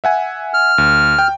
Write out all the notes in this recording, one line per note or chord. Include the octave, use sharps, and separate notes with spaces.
E5 F#5 G#5
F6
D2
G5